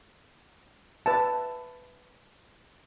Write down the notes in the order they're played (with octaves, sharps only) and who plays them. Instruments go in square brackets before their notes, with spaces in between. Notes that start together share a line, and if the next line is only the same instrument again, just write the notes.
[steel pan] B4 E5 A5